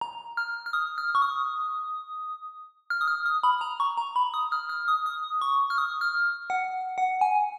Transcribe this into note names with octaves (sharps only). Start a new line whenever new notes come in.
A#5
F6
F6
D#6
F6
C#6
D#6
F6
D#6
F6
D#6
B5
A#5
C#6
A#5
B5
D#6
F6
F6
D#6
D#6
C#6
F6
D#6
F6
F#5
F#5
G#5